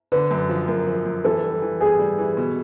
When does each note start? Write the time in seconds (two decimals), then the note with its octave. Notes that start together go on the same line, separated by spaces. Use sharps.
0.12 D3 B4
0.31 F#2
0.49 F3
0.68 F#2 A#4
0.87 F3
1.05 F#2
1.24 E3 A4
1.43 G3
1.62 E3
1.81 G3 G#4
1.99 G3
2.19 E3
2.37 B2